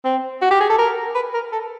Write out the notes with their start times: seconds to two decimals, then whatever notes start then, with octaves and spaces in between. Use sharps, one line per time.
0.05 C4
0.42 F#4
0.51 G4
0.61 G#4
0.70 A4
0.79 A#4
1.15 B4
1.34 A#4
1.52 A4